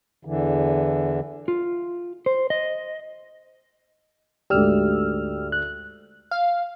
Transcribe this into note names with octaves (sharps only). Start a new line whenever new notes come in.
E2 D3 E3
F4
C5
D#5
D2 G#2 G4 D5 E6 F6
F#6
F5